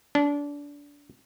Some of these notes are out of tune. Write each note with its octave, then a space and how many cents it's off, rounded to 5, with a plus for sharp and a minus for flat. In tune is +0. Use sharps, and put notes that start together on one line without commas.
D4 -25